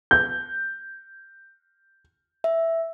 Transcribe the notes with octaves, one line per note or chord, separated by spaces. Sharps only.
G6
E5